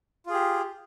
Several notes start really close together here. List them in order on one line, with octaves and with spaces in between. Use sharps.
F4 G#4 G4